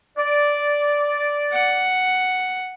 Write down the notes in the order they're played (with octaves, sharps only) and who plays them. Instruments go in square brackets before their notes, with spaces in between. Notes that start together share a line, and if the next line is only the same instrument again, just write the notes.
[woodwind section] D5
[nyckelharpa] F#5